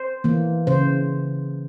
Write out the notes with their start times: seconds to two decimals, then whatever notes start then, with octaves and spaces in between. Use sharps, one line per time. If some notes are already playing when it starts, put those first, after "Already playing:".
Already playing: C5
0.24 E3 A#3
0.67 C#3 C5